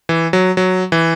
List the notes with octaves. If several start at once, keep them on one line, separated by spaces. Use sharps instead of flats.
E3
F#3
F#3
E3